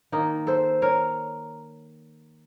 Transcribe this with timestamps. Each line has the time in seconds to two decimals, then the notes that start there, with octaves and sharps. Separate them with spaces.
0.12 D#3 A#3 D#4
0.47 A4 C5
0.82 A#4 C#5